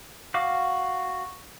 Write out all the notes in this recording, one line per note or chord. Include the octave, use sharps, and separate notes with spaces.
F#4 F5 D6